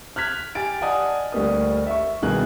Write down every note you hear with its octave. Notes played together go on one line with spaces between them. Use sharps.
F6 F#6 G#6 B6 F7
G4 G#5 A6 D7
D5 D#5 F#5 G#5 A5 D#6
D2 G3 A#3 D#5 D#6
E5 C#6
C2 B2 D#3 G#4 A#4 F#6